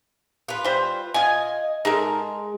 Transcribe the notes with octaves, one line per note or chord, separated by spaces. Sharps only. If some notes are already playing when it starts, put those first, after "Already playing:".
F4 B4
G3 C5
F4 D#5 G#5
G#3 D#4 A4 A#4